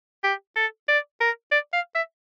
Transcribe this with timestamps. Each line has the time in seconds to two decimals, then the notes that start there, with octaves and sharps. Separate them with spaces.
0.24 G4
0.56 A4
0.88 D5
1.20 A#4
1.51 D5
1.73 F5
1.95 E5